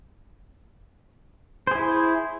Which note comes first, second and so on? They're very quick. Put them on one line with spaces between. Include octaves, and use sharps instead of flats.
C5 G#4 E4